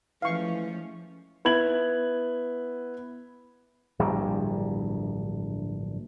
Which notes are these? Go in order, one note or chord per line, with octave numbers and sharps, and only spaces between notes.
E3 F3 G#3 A3 C#4 F5 C#6
B3 E4 G#6 F#7
D1 A#1 G2 G3